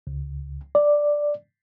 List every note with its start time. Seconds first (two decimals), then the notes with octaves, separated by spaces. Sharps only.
0.07 C#2
0.75 D5